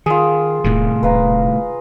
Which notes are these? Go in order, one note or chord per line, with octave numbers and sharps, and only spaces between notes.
D#3 F4 G#4
D1 A2 C3 D#3
D#1 B4 F5 A#5